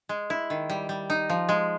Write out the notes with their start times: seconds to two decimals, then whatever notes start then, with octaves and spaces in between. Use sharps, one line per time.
0.09 G#3
0.30 E4
0.50 D#3
0.70 G3
0.89 G3
1.10 D#4
1.30 F3
1.49 G#3